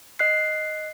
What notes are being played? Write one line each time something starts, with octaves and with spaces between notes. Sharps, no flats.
D#5 F#6 C7